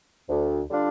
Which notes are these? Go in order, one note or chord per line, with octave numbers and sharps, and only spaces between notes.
D2
D3 G3 D4 F4